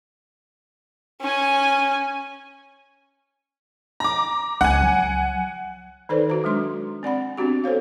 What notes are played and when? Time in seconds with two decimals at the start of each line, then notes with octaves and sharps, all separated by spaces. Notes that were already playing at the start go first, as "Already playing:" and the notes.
1.21 C#4 G#5
4.00 A#5 D6
4.61 C#2 F#5 G#5
4.81 F#3
6.09 D#3 D#4 A4 B4 C5 D5
6.30 F#4 A#5
6.44 F#3 G#3 D4 C6
7.03 C4 D5 F#5 B5
7.37 B3 C4 D4 F#4 G4
7.64 A4 C5 C#5 F5